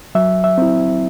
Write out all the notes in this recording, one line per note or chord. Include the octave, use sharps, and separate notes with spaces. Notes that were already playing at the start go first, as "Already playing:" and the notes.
F#3 E5
E5
C4 E4